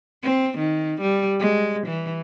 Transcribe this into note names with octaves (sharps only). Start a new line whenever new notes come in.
C4
D#3
G3
G#3
E3